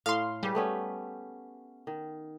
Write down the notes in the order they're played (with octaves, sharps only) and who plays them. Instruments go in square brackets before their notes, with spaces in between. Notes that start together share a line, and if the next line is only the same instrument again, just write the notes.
[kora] A2 [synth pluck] F5 C6
[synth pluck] G3 [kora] G#3 G4 B4
[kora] A3 B3 C#4
D#3